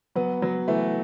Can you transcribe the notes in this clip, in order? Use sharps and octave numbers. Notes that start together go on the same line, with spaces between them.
F#3 B3
F#3 B3
E3 A3